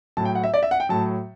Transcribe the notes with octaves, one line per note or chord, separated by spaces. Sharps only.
A2 F#3 A5
G5
F#5
E5
D5
E5
F#5
G5
A2 F#3 A5